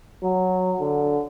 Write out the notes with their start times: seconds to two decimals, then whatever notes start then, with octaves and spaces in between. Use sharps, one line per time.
0.24 F#3
0.80 D3